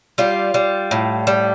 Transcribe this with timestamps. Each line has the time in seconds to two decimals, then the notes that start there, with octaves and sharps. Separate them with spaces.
0.18 G3 F4
0.54 G3
0.91 A2
1.27 G3